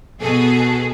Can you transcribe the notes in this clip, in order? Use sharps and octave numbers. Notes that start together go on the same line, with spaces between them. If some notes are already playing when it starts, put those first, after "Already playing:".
B2 G#4 A4